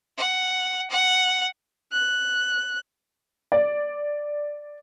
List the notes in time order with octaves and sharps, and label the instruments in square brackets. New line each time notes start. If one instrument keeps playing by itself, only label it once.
[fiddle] F#5
F#5
[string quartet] F#6
[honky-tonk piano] D5